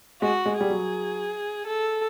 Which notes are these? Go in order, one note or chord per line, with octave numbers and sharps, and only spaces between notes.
G#3 F#4
G#3
G3 G#4
F#3
A4